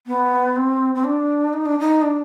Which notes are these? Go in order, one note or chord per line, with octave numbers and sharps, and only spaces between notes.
B3
C4
C4
D4
D#4
D4
D#4
D4